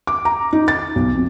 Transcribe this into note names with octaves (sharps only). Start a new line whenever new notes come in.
D6
A#5
D#4
A6
B1
F2